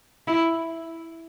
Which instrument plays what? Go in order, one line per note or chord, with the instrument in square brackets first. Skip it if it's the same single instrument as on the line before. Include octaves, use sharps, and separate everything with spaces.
[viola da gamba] E4